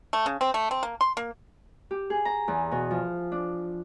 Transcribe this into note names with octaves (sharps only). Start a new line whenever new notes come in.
A3
C#3
C4
A3
C4
A#3
C6
A#3
G4
G#4
A#5
E2
B2
F3
D4